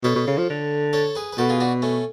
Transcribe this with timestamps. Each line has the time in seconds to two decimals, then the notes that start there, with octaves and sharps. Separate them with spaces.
0.04 B2 A4 C#5
0.15 B2
0.27 C#3
0.38 F3
0.50 D3
0.93 A4 C#5
1.15 G#4 B4
1.33 B4
1.38 B2 F#4 A4
1.49 F4 G#4
1.60 D4 F#4
1.82 A3 C#4